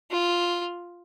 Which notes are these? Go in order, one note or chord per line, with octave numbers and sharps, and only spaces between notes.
F4